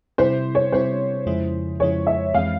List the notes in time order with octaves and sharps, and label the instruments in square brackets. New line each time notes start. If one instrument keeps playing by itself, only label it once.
[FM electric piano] C3 G3 C4 E4 [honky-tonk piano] C5
[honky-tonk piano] C#5
[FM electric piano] C3 G3 C4 E4 [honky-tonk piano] C5
[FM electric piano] F2 C#3 F3 G#3 E4
[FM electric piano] F2 C#3 F3 G#3 E4 [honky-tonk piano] C#5
[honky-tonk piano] E5
[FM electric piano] F2 E3 G#3 C4 [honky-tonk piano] F5